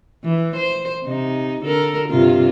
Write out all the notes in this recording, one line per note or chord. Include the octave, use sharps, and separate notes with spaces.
E3
C5
C3 D#4
D3 A4 A#4
G2 C3 F4